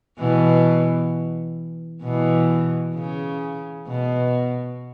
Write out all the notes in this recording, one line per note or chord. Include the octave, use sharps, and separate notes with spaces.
B2 E3
B2 E3
C#3
B2